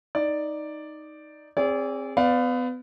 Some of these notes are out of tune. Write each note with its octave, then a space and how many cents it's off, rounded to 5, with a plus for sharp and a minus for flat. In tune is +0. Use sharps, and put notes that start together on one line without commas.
D#4 +0 D5 +0
C4 +15 G#4 -20 D5 -35
B3 +30 D5 -5 F5 +25